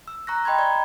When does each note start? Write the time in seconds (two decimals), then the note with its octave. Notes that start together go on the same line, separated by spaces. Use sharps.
0.08 E6
0.27 A#5 C#6 F#6 A#6
0.45 D#5 G5 B5 C6 G#6
0.59 D5 A#5 G#6